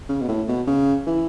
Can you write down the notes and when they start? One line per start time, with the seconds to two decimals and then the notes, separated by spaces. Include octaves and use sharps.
0.09 C#3
0.22 B2
0.29 A2
0.49 B2
0.67 C#3
1.07 E3